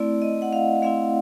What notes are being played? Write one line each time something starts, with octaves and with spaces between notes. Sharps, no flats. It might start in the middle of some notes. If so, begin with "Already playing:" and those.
Already playing: A3 C4 E4 D5
D#5
F#5
F5
A3 C4 E4 F5